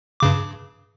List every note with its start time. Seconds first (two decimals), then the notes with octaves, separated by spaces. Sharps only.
0.20 G2 C#3 D6